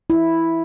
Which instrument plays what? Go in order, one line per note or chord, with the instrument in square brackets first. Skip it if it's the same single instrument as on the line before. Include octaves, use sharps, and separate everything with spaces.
[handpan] E4